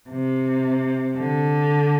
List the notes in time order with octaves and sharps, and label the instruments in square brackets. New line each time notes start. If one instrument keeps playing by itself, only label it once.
[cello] C3
D3